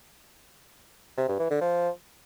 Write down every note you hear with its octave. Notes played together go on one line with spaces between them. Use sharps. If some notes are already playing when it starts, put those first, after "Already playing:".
C3
G2
E3
D3
F3